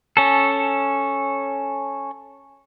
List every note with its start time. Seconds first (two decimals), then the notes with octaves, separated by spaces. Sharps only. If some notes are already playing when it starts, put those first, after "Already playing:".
0.17 C#4 A4